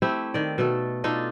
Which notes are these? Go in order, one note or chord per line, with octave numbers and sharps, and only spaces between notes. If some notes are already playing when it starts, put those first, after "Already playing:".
A3 C4 E4 G4
D#3 D5
B2 A3 A4
D4 D#4 F4 A4